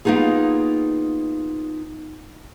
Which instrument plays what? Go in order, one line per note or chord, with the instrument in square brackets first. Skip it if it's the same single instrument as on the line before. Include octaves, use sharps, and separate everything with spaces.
[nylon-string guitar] A#3 B3 D#4 F4 G#4